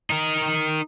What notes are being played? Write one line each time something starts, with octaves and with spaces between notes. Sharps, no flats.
D#4 A#4